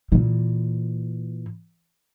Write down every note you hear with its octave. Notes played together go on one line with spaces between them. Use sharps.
A#2 E3